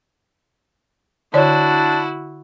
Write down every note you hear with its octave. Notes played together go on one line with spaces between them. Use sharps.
D3 D4 E4 F#4 C#5 D5